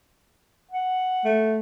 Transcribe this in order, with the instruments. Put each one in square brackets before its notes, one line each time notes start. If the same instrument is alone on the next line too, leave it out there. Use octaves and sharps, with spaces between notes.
[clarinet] F#5
[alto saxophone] A3